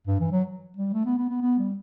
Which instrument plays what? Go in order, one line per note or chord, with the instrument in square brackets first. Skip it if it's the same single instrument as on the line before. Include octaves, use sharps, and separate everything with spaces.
[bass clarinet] G2
E3
F#3
G3
A3
B3
B3
B3
B3
G3